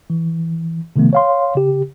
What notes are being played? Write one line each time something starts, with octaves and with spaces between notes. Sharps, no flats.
E3
C3 D#3 F3 A3 B3
C#5 F5 C6
C#3 G4